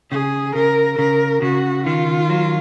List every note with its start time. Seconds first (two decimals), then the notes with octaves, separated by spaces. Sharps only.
0.11 C#3 G#4
0.55 C#3 A#4
0.98 C#3 A#4
1.42 C#3 F#4
1.86 D#3 F4
2.30 F#3